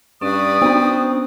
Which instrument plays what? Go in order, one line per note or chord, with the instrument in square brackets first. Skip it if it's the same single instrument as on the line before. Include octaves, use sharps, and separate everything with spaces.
[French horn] G2 [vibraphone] C#4 C#6 [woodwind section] B4 D5 D#6
[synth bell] B3 D4 [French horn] C4